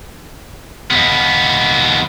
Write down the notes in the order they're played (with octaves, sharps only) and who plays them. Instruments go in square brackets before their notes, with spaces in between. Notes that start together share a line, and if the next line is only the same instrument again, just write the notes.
[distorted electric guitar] D#2 B3